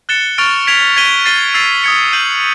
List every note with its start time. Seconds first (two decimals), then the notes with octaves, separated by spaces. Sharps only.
0.09 F#6 A6 C#7 E7 G7
0.38 C#6 F6 A6 D7 F7
0.67 G#6 B6 D7 F7
0.96 G#6 B6 D#7 G7
1.26 A6 C7 D#7 G7
1.54 E6 A6 C7 F7
1.84 D#6 G#6 C#7
2.13 G6 C7 D#7 F#7